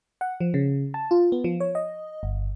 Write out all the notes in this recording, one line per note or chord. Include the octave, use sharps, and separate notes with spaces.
F#5
F3
C#3
A5
F4
B3
F3
C#5
D#5
G1